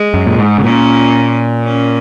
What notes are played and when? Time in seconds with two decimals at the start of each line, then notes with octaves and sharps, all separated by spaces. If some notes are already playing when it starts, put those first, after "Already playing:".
Already playing: G#3
0.14 F#2
0.27 A#2
0.38 G#2
0.58 C#3
0.64 A#2 C#4
1.64 C#4